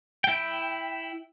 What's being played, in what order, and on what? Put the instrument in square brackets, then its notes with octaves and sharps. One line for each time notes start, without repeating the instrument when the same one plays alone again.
[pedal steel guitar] E4 G5